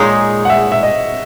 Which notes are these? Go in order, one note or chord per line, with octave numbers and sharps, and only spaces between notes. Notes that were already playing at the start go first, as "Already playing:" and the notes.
Already playing: A#2 G#3 D#4 G#4 C#5
F#5
E5
E5
D#5